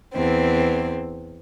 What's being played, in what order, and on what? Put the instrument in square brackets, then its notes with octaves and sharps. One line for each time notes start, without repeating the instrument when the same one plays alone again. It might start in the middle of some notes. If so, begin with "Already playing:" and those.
[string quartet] E2 C4